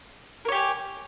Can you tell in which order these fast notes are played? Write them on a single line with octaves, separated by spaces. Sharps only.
A#4 C#5 G4 G#5